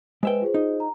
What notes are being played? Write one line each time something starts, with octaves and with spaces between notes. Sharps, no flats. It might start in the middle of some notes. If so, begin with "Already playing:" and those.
G#3 B4 C5 E5 G5
F4 G#4 C5
D#4
A#5